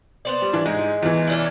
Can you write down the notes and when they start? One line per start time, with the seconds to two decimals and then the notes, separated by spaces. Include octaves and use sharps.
0.25 B3 C5 D5
0.42 G3
0.53 E3 D4
0.66 G#2 G#3
1.03 E2 E3
1.27 C#4 D4 E4